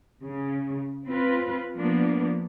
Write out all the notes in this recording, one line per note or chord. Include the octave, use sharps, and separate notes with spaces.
C#3
C4 F4 B4
F3 A#3 B3 D4